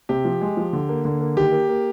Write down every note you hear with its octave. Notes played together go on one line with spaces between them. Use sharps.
C3 G4
F3
G#3
F3
D3
A#3
D3
A#3
D#3 G4
A#3
A#3